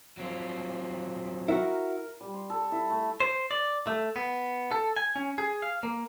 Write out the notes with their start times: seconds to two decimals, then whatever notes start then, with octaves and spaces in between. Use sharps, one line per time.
0.17 F#3 C4 F4
1.48 E4 F#4 A#4
2.21 G3
2.34 C6
2.50 A4
2.72 E4
2.90 A3
3.20 C5
3.51 D5
3.87 A3
4.16 B3
4.71 A4
4.96 G#5
5.16 C#4
5.38 G#4
5.62 F5
5.83 A#3